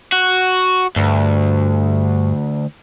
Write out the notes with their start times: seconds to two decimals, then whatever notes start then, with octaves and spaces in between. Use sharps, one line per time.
0.12 F#4
0.96 D2 G2